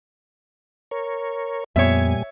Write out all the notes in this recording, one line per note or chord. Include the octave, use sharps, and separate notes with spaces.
A#4 C#5
F2 A#2 G3 B3 C#5 E5 G#5